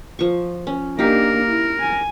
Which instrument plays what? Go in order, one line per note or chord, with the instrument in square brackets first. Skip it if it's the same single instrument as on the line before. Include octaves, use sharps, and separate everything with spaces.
[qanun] F3 C#6
C#4
[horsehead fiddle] A#3 D4 [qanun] D#4 G4 [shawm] A#4
[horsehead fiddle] E4
G#5